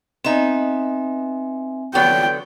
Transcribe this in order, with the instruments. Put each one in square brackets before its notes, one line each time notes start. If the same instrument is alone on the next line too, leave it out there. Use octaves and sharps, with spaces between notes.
[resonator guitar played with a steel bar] B3 D#4 [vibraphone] C4 E5 G#5
[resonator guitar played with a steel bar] D3 F#3 B3 [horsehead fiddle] G5